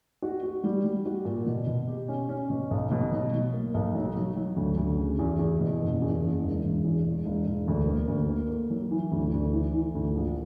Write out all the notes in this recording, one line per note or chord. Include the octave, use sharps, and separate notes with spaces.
F#4
F#4
G3
G3
F#4
A#2
B2
B2
G4
C#4
C#4
B2
B1
B2
F#3
F#3
A#3
B1
F#3
F#3
F#3
D2
D2
C#3
E2
E2
B2
F#1
E2
F#1
E1
E1
E2
E1
E1
E1
D2
A#3
D2
A#3
A#3
F#3
E3
D2
D2
E3
E3
D2
A#1